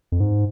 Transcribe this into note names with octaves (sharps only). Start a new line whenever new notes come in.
F2
G#2